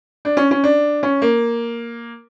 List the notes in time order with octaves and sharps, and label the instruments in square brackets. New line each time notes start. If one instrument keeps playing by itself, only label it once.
[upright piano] D4
C#4
C#4
D4
C#4
A#3